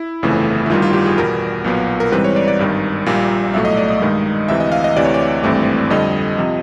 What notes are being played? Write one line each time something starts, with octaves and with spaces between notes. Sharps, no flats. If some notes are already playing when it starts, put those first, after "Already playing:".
Already playing: E4
G1 F2 C#3 E3 A3
E4
G1 G2 D#3 G3 F4
F4
G4
G#4
E2 B2 G3 A#4
B1 A#2 F#3 B3
A#4
G#2 E3 G3 C4 B4
C#5
D5
D5
G#1 G2 D#3
A#1 A#2 G3 A#3
B1 A2 F#3 A3 E5
D#5
D5
D#5
G2 D#3 G#3
D2 C3 E3 E5
D#5
F5
D#5
D2 C3 E3 D5
C#5
D5
G#1 G2 E3 A3 C4
F2 D3 G3 D#5
C3 F3